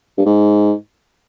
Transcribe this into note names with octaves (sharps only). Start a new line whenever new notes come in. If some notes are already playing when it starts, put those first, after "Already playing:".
G2
G#2